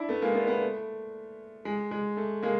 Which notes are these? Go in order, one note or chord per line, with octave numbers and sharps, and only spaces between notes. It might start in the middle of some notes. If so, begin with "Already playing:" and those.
Already playing: D4 E4
A3 B3
G#3 A#3
A3 B3
A3 B3
A3
G#3
G#3
A3
G#3 A#3